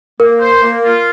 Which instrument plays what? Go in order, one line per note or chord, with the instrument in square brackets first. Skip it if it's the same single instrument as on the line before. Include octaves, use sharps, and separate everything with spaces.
[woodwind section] A#3 [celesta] A#4
[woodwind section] C5
A#3
F4